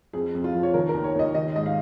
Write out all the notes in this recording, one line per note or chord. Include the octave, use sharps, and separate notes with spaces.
F2 G#4
F2
F4
F3
C#5
D#3 A#4
A#4
D#2
C#5
D#2 D#5
D#3 D#5
G#2 D#5
F5